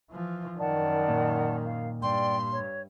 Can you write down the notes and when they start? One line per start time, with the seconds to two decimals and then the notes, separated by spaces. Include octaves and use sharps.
0.11 E3 F3
0.58 F#2 D#3 D5 F#5 A5
1.09 A#2
1.65 F5
2.02 G2 D5 G5 C6
2.52 C#5